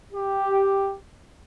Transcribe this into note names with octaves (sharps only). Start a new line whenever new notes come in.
G4